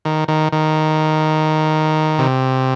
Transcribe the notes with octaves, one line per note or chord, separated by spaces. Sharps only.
D#3
D#3
D#3
C3